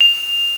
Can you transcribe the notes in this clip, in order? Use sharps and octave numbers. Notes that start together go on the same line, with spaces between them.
F7